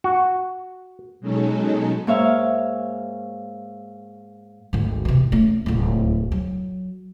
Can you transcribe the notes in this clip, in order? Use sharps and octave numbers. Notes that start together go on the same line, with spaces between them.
F#4
B2 F#3 G#3 C#4 D#4 A4
G#2 A#3 C#5 E5 F5
G#1 D2
C3 E3
A3 C#4
D1 C#2
F#3